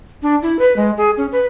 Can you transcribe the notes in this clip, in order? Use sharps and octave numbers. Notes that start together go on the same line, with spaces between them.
D4
E4
B4
G#3
G#4
C#4
B4